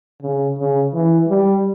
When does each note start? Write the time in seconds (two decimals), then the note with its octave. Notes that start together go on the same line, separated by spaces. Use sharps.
0.21 C#3
0.57 C#3
0.93 E3
1.28 G3